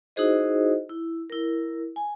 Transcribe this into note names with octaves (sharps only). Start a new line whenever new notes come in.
D#4 E4 F#4 G#4 C5 D#5
E4
E4 A#4
G#5